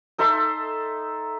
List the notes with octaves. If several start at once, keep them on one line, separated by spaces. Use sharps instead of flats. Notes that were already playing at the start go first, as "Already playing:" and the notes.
D#4 A4 E5 C6